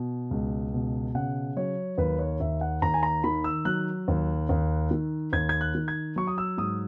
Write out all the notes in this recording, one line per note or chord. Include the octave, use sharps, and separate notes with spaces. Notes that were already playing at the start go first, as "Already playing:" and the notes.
Already playing: B2
C#2
B2
C#3 F#5
F#3 C#5
D#2 B4
C#5
D#2 E5
F#5
D#2 A#5
G#5
A#5
D#3 B5
E6
F#3 F#6
D#2
D#2
D#3
D#2 G#6
G#6
F#6
D#3
G#6
F#3 C#6
D#6
E6
G#2 D#6